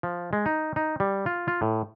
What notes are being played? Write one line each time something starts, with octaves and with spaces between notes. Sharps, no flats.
F3
G#3
D#4
D#4
G3
F4
F4
A2